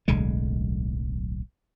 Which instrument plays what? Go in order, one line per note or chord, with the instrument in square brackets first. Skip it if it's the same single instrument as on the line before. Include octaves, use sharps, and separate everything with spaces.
[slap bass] D1 B1 D3 G#3